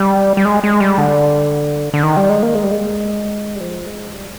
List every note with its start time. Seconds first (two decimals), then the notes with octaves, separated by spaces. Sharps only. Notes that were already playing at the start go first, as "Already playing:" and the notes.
Already playing: G3
0.37 G3
0.45 G#3
0.64 G#3
0.80 G3
0.98 D3
1.94 D3
2.03 D#3
2.17 G3
2.29 G#3
2.43 A#3
2.55 G#3
2.64 G3
2.71 G#3
3.56 G3
3.60 F3
3.87 G#3
4.14 G3